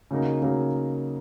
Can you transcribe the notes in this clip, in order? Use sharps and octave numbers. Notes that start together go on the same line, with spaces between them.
C#3 F#3 A#3 D#4
C#3 F#3 A#3 D#4